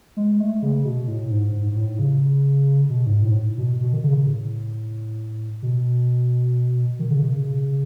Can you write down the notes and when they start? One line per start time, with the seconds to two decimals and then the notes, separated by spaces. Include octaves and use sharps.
0.17 G#3
0.40 A3
0.62 C#3
0.85 B2
1.08 A2
1.30 G#2
1.53 G#2
1.72 G#2
1.76 A2
1.99 C#3
2.90 B2
3.07 G#2
3.24 A2
3.58 B2
3.81 B2
3.93 D#3
4.04 C#3
4.27 A2
5.63 B2
6.99 D#3
7.11 C#3
7.22 B2
7.33 C#3